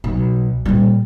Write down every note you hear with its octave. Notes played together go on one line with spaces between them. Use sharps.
B1
A#2 G3